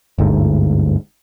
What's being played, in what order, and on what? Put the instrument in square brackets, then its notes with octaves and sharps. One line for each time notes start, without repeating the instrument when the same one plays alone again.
[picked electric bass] G1 D2 G#2